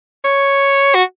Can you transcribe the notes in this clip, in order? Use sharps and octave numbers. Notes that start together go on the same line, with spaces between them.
C#5
F#4